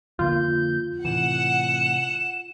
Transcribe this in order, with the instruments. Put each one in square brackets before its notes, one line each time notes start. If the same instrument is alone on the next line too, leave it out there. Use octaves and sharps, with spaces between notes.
[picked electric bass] F2 D3 A#3 [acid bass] F4 [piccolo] G6
[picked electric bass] A2 C3 E3 [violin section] F#5 [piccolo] E7